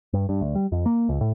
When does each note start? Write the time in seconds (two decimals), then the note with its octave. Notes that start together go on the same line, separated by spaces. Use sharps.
0.13 G2
0.29 G2
0.41 D2
0.55 G3
0.72 F2
0.86 A#3
1.09 C#2
1.21 A2